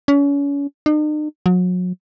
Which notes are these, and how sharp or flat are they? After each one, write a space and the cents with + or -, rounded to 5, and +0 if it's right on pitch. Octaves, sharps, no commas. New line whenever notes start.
C#4 +35
D#4 -45
F#3 -35